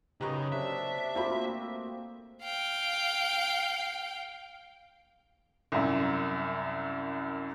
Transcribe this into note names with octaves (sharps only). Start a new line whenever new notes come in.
F#2 C#3 D#4 G4 B4 D#5 A#5 C#6
C3 D4 E5
A3 A#3 C4 F4 F#4 B5
F5 G5
C2 F#2